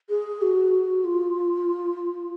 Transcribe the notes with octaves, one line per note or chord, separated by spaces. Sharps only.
G#4
F#4
F4